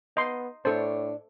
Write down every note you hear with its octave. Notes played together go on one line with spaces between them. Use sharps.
B3 D#5 C6
A2 D4 A4 C5 C#5